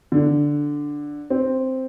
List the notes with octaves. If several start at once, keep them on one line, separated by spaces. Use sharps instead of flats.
D3
C4